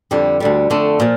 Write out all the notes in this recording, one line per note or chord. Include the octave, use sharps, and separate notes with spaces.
F2 D3 G3
D2 D3 G3
F2 D3 A3
A#2 F3